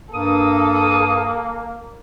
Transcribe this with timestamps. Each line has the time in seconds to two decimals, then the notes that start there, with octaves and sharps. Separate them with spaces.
0.13 G2 A#3 A4 D#6